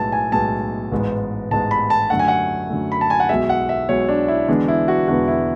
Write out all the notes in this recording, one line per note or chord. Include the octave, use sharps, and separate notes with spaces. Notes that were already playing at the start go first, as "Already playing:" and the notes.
Already playing: B1 A2 G#3 B3 A5
G#5
B1 A2 G#3 B3 A5
A1 G#2 G#3 B3
A1 G#2 G#3 B3 A5
B5
A5
F#2 D3 A3 F#5
G#5
F#5
F#2 D3 A3
B5
A5
G#5
F#5
B1 B2 G#3 E5
F#5
E5
B1 B2 G#3 C#5
D4
E4
E1 E2 D3 G#3 B3 D4
E4
F#4
E1 E2 D3 G#3 B3 F#4
E4